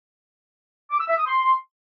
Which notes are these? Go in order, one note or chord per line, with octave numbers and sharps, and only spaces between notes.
D6
E6
E5
D#6
C6